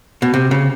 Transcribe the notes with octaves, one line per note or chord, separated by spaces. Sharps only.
B2
C3
C#3